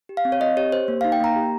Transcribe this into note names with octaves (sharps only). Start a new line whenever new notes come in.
G4
F5
C4
C#5
C4 D#5
G4 C#5
G4 C5
A#3
F5
D#4
G5
A#3 A#5
G4